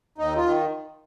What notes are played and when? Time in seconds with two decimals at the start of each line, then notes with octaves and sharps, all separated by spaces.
0.18 D#2 D#4
0.37 F4
0.45 D#3